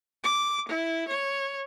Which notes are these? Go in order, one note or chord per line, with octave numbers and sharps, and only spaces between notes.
D6
E4
C#5